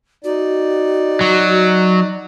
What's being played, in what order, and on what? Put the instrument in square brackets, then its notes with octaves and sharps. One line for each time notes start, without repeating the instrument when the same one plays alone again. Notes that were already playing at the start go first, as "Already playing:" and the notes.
[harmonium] D#4 D5 [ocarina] F#4
[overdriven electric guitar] F#3